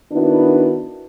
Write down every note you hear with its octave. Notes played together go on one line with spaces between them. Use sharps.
D#3 B3 D4 E4 F#4